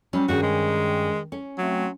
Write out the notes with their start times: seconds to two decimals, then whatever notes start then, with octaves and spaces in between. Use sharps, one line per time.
0.13 F#3 G3 C#4
0.28 G2 D#3 C#4 F#4 G#4
0.43 G#3
1.32 C#4
1.58 F#3 A3 C4